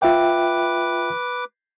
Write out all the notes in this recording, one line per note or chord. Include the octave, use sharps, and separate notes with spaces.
F4 B4 E5 G5 D6